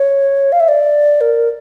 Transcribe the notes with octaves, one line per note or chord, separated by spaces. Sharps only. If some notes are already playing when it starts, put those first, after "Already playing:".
Already playing: C#5
F5
E5
D5
A#4